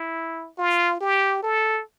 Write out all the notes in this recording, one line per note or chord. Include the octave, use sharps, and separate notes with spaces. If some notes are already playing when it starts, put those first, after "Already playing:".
Already playing: E4
F4
G4
A4